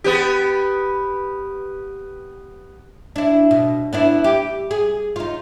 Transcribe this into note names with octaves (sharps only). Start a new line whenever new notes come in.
B3 G4
D4 E4
B2
B3 D4 E4
G4
G#4
D#4 F4